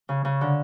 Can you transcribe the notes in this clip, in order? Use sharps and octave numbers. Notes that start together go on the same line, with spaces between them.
C#3
C#3
D3